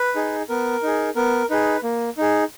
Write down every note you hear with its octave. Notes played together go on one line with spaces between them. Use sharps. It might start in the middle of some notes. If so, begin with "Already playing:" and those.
Already playing: B4
D#4 G#4
B3 A#4
D#4 G#4
B3 A#4
D#4 G#4 B4
A#3
D#4 G#4